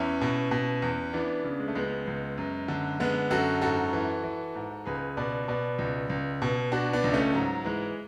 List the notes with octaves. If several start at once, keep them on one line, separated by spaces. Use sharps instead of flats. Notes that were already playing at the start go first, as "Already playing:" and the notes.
Already playing: E2 C#4 E4
B2
B2
E2
E3 B3 D4
C#3
G#3
A3
C#2 G#3 B3
C#2
F#2
D3
D3 G#3 B3
F#2 F#4 A4
G#2 F#4 A4
E3
E3
G#2
C#2 G#4 B4
B2 B4 D5
B2 B4 D5
C#2
C#2
B2
B2 D4 F#4
B3 D4
C#2
A3 C#4
G#2 F#3
E3 G#3